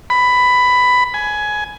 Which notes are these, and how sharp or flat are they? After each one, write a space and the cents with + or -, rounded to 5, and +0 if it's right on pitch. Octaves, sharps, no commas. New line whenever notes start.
B5 +10
G#5 +15